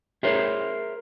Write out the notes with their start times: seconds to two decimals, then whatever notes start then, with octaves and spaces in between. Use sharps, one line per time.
0.23 G#4 A#4 C5 C#5 E5